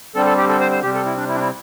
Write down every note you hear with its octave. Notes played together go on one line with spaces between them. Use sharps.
D3 G3 C4 A4
A4
G4
A4
C5
C5
C3 G3 C4 G4
A4
E4
D4
E4
D4
E4